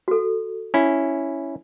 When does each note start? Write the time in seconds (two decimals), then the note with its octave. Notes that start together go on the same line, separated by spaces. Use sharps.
0.08 F#4 A4
0.74 C#4 E4